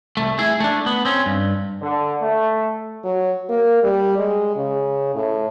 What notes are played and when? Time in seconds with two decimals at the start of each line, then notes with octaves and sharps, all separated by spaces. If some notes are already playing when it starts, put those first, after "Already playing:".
0.17 C2 A3
0.39 E4 G#4
0.60 A3 D4
0.86 B3
1.05 C4 C#4
1.26 G2
1.82 D3
2.21 A3
3.04 F#3
3.49 A#3
3.83 G3
4.18 G#3
4.56 C#3
5.15 A2